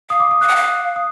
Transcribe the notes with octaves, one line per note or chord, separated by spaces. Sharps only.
F5 D#6
D6
D#6
F5 F#6
F#5
F5
D#6